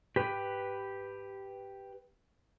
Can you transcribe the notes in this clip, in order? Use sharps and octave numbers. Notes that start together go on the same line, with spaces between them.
G4 B4